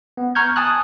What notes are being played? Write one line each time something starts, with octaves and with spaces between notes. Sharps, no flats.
B3
A#5 C#6 F6 G6 G#6
G#5 A5 D#6 F6 F#6